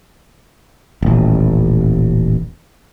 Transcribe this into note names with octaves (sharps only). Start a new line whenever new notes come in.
D#1 A1